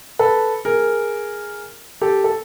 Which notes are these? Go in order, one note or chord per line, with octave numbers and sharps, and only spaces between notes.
A4 B4
G#4 A#4
G4 A4
A4